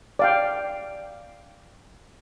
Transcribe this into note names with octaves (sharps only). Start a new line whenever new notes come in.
D5 F5 G5